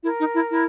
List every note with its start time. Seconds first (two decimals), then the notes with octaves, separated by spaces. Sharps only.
0.03 E4 A#4
0.20 D#4
0.34 E4
0.51 E4